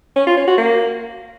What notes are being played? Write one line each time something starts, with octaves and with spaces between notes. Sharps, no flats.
C#4
F4
C#4
F#4
A#3